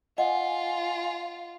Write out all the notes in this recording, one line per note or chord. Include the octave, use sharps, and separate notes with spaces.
F4 D#5 F#5 G#5